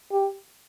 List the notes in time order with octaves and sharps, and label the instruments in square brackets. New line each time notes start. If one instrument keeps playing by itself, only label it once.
[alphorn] G4